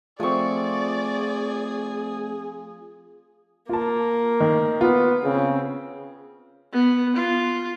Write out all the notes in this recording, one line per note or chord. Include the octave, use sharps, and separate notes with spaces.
F3 A3 C4 G#4 D5 C#6
A#3 F4 A5
D#3
B3 F4
C#3 C4
B3
F4